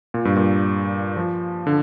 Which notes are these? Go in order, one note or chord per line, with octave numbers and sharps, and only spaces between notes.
A#2
G2
A#2
F3
D3